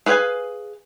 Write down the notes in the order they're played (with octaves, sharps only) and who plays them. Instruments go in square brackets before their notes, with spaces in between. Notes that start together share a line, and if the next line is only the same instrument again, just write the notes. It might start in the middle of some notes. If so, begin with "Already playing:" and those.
[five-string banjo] G#4 B4 F5 G5 G#5